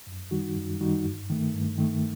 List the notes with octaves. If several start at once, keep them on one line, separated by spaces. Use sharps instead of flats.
F#2
D#3 G3 D#4 F#4
F#2
D#3 G3 D#4 F#4
G2
D#3 A3
G2
D#3 A3